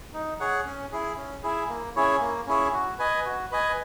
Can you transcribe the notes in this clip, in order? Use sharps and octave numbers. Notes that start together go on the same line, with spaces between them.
D#4
G#4 C#5 F#5
C#4
E4 G#4
C#4
E4 G#4
A#3
C#4 E4 G#4 C#5
A#3
C#4 E4 G#4 C#5
F#4
B4 D#5 G#5
F#4
B4 D#5 G#5